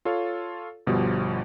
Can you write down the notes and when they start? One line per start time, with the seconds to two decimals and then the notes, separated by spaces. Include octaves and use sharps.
0.05 F4 A4 C#5 F5
0.87 G1 B2 F3 G3